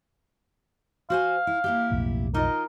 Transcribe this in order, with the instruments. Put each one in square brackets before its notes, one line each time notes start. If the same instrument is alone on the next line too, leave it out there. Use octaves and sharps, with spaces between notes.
[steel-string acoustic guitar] F#4 C5 G#5 [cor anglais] F5
[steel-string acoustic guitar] E4
A#3 E4 G4
[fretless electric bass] B1 F2 A2
[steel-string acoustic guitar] D#4 F4 D#5 [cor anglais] A#4